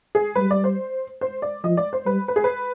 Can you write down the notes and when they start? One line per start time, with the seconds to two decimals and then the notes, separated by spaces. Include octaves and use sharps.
0.15 G#4
0.35 G3 B4
0.51 D5
0.64 C5
1.21 C5
1.42 D5
1.64 F3 D#5
1.77 D5
1.93 C5
2.06 G3 B4
2.28 B4
2.36 G#4
2.44 B4